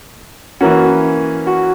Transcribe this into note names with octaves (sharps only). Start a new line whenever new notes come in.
E3 A#3 C#4 F#4
F#4